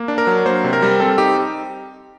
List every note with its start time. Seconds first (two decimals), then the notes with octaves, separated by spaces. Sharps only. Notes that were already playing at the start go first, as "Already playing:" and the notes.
Already playing: A#3
0.08 D4
0.18 A#4
0.27 F#3
0.46 A#3 C5
0.64 C3
0.73 A#4
0.82 G3
1.00 C4 A4
1.18 D#4 G4